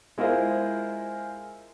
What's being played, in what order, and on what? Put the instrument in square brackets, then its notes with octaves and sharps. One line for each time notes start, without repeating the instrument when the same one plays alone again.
[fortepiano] G#3 E4 F4 G#4 A#4 C5